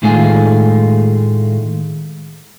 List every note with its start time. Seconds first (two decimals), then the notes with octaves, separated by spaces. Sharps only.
0.02 A2 D#3 G#3 A3 F4 G#5